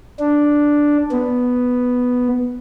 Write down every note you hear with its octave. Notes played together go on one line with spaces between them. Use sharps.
D4
B3